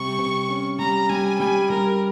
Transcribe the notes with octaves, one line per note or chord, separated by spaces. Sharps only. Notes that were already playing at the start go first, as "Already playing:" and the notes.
Already playing: C3 G3 C#6
C3
C#4
G3 A#5
G3 G#5
G3 G#5
G3 A#4